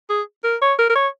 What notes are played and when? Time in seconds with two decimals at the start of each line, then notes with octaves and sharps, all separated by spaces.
0.10 G#4
0.44 A#4
0.62 C#5
0.79 A#4
0.89 A#4
0.95 C#5